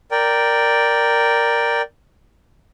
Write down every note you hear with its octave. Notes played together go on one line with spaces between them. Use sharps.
A#4 D5 G5